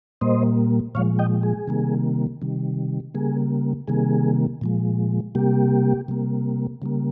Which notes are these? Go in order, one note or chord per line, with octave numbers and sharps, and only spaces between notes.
A#2 G3 A#3 C5 D#5
A#2 F3 G#3 C#5 F5
D#5 G5
G#4
C3 D#3 G3 A#3
C3 D#3 G3
C#3 G3 A#3 G#4
C3 D#3 G3 A#3 G#4
A#2 F3 G#3
C3 G3 A#3 G4
C3 G3 A#3
C#3 G3 A#3